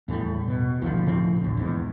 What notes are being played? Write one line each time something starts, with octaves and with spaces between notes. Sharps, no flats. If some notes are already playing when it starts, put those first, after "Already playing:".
E2 A2 G3
B2
A1 D2 D#3 F3
A2 C#3 F3 C4
A#1 D#2
E2 G#2